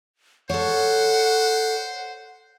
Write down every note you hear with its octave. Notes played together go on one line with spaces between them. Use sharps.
A4 C5 C#5 F#5